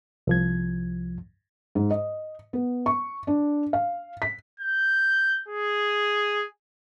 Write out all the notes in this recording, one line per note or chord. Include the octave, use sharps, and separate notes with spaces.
C2 F3 G#6
G#2
D#5
B3
C#6
D4
F5
B6
G6
G#4